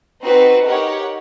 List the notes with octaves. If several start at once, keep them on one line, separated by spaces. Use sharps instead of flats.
C4 D#4 F#4 B4
D#4 G4 A#4 C#5 F#5